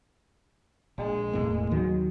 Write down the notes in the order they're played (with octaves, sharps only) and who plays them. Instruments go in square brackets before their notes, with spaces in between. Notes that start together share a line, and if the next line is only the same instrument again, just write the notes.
[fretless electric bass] A#1 [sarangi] G#3
[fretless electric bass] E1 A2 A#3
D#2 D#3 F#3